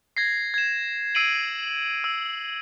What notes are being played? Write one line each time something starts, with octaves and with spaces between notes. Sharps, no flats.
G#6 A#6 C7
G#6 E7
E6 C7 D7 D#7 F#7
E6